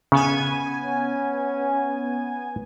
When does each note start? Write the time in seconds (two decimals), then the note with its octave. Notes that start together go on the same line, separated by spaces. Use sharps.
0.12 C#3 B3 G#5
0.81 C#4